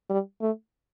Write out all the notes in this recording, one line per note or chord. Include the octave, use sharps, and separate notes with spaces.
G3
A3